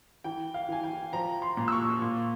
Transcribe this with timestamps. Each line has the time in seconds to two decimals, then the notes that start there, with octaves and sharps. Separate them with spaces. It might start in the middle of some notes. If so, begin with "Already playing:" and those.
0.24 E3 G5
0.54 F5
0.69 E3 G#5
0.83 G5
1.13 F3 A#5
1.42 C6
1.57 A#2
1.68 E6
1.72 C#6
2.02 A#2